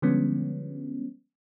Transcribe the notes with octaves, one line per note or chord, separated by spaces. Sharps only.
D3 F3 G3 G#3 B3 C#4